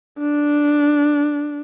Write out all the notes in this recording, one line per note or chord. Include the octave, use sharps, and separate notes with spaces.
D4